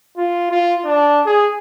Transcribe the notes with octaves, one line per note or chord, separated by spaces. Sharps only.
F4
F4
D4
G#4